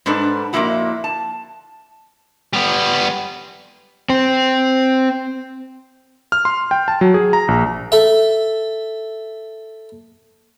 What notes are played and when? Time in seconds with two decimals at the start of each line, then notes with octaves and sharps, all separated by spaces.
0.06 G#2 G3 D4 A4 B4
0.53 F2 A#2 D3 A#3 E4 F#4
1.04 A5
2.53 G3 B3
4.10 C4
6.32 F6
6.45 C6
6.71 G5
6.88 A5
7.01 F#3
7.14 G#4
7.33 A#5
7.48 A#1
7.92 A4 E5